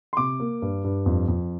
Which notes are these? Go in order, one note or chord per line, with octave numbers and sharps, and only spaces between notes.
C6
C3 D6
A#3
G2
G2
F2
F2